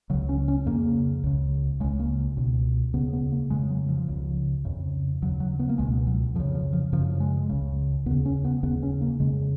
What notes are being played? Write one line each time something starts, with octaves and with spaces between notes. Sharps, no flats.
C#2 C#3 F#3
C#4
C#4
F2 C#3 A#3
C#2 C#3
C#2 C#3 G#3
A#3
C#2 B2
D#2 C#3 B3
B3
A#3
F2 C#3 G#3
F#3
F3
C#2 C#3
F2 C#3
D#2 C#3 F#3
F#3
B3
A#3
C#2 B2 G#3
F#3
F2 C#3 F3
F3
F3
F#2 C#3 F3
G#3
C#2 C#3
D#2 C#3 B3
C#4
B3
D#2 C#3 B3
C#4
A#3
F2 C#3 G#3